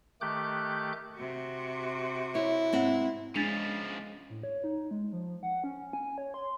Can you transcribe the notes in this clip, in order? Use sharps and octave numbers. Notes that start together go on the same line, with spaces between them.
D#3 A3 G4 D6 F#6 G6
C3 F#4
E4 C#5
G#2 C4 F#5
C#3 F3 G#3 C#4 D4 A6 B6 F7
A2
C#5
D#4
G#3
F3
F#5
C#4
G#5
C#5
C6